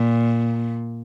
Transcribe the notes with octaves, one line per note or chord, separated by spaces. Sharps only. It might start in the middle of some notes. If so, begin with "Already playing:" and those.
Already playing: A#2